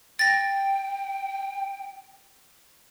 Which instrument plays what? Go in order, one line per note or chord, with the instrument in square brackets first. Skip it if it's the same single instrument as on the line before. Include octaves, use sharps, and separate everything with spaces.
[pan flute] G5 [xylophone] A6 A#6